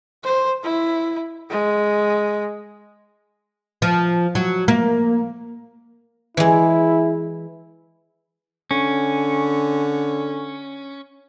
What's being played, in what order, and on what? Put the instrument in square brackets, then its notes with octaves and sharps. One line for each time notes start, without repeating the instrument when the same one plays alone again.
[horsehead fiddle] C5
E4
G#3
[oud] F3
F#3
A#3
[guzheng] E3 G#3 [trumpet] E4
[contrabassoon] D3 [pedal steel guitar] C#4